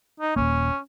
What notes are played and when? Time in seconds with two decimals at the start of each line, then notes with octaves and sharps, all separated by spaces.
0.20 D#4
0.36 D#1 D#2 A#3 C#4